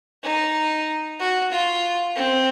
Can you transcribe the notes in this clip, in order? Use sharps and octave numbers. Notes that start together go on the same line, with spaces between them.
D#4
F#4
F4
C4